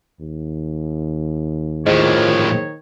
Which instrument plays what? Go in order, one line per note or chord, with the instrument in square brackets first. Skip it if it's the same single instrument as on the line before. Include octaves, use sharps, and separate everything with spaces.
[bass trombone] D#2
[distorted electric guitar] A2 F3 [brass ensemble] D#3 C#5 [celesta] G#4 C5 D#5